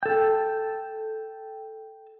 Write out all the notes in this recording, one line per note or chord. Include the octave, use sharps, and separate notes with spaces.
A4 G5